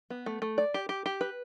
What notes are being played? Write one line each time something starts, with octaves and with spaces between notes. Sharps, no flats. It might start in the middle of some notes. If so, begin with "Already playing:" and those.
B3
A3
A3
D5
G4
G4
G4
B4